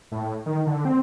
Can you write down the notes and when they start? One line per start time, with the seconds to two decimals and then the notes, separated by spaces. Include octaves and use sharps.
0.12 A2
0.46 D#3
0.67 D3
0.85 C4